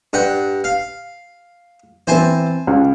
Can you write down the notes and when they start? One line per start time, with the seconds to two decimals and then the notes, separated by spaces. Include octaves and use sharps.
0.13 G2 F#5 G5
0.64 F5
2.07 E3 C4 C5 G#5 A5
2.67 C#2